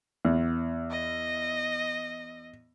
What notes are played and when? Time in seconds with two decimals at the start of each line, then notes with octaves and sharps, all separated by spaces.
0.25 E2
0.90 D#5